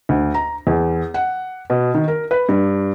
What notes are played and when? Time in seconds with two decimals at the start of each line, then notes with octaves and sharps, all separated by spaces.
0.09 D2
0.34 A#5
0.67 E2
1.14 F#5
1.70 B2
1.94 D#3
2.08 A#4
2.31 B4
2.49 G2